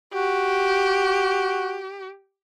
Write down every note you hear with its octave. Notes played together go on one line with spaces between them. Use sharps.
F#4 G4